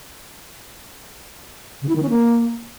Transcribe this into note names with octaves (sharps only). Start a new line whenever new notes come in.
C#3
E4
D#3
C#4
A#3